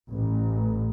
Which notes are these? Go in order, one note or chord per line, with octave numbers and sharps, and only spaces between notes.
A1